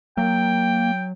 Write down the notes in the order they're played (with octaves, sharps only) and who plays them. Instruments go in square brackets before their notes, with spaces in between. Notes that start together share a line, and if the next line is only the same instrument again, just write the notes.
[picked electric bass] F#3 [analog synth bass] A#3 [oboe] G5